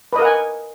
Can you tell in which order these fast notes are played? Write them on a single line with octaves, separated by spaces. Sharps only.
B4 D#5 A#4 F#5 G#5